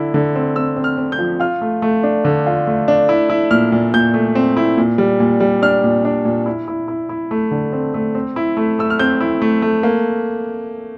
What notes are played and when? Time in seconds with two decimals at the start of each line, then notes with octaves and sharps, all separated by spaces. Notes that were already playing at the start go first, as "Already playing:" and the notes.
Already playing: D3 E4
0.14 D3
0.35 C4
0.56 C4 E6
0.76 C4
0.84 F6
0.97 C4
1.12 G6
1.19 F3
1.40 F4 F6
1.61 A3
1.82 A3
2.03 D4
2.25 D3
2.46 F4
2.67 A3
2.88 D4
3.09 E4
3.30 E4
3.51 A#2 F6
3.72 A#2
3.94 A#2 G6
4.14 A3
4.35 C4
4.57 E4
4.77 A#2
4.98 G3
5.20 A#2
5.40 G3
5.62 D4 F6
5.84 A#2
6.05 D4
6.25 A#2
6.46 E4
6.68 E4
6.88 E4
7.09 E4
7.31 A3
7.51 D3
7.73 C4
7.94 A3
8.15 C4
8.36 E4
8.57 A3
8.79 A3 E6
8.90 F6
8.99 C4 G6
9.21 E4
9.42 A3
9.62 A3
9.83 A#3